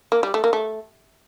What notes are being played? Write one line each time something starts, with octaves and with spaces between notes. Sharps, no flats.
A#3
G3
A3
A#3
A3